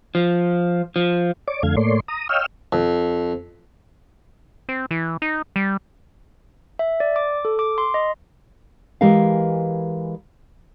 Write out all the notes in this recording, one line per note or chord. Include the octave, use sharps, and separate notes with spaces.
F3
F3
C#5 D5 D6
F2 D3 A3 F5 G#6
A2 A3 A#3 C#5 D5 C6
A#5 D#6
C#5 D#5 F5 G5 E6 F6
F2
C4
E3
D#4
G3
E5
D5
D6
A4
D6
C6
D#5
E3 G#3 G4 A#4 B4 F5